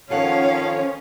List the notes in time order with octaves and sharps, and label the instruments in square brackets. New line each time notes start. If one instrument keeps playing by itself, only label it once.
[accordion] D#3 F3 C#5 [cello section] C#4 [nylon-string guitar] F4 A4 F#5 [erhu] F5